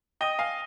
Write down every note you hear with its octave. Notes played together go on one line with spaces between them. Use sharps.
D#5 G5 D#6 A#6 D#7 G7
F5 G#5